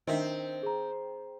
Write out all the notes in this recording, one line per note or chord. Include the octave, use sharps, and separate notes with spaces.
D#3 C4 D4 A#4 D#5 E5
G#4 A#5